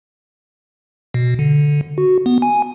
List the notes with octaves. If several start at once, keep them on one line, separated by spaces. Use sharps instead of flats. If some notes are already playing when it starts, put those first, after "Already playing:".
B2
D3
F#4
B3
G#5